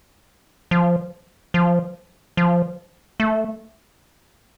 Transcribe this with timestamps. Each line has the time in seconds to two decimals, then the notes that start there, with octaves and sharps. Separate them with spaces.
0.71 F3
1.54 F3
2.37 F3
3.20 A3